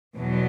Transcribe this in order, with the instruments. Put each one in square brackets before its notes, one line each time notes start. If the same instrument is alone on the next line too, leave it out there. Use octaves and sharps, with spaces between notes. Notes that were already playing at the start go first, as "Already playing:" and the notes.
[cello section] E2 B2 F#3